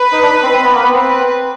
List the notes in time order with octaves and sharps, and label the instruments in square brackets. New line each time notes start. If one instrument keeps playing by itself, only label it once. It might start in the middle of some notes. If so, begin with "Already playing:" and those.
Already playing: [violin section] B4
[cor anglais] D#4
D4
C4
C4
B3
A#3
B3
[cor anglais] C4 [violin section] B4